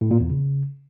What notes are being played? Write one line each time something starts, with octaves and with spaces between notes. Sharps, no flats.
A2
A#2
E2
C#3